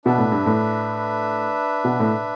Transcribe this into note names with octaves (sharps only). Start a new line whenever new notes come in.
B2 D4 B4 E5
A2
G2
A2
B2
A2